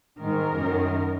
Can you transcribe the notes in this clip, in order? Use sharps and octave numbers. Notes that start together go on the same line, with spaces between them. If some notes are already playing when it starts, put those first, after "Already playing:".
G#2 D#3 A#4
F#2 D#3